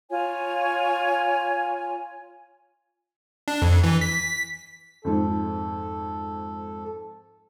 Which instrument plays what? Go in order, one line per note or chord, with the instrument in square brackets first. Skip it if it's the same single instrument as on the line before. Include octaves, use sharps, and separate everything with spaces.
[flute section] F4 C#5 G#5
[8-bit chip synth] D4
F2
E3
B6
[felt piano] F2 G#2 [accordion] A4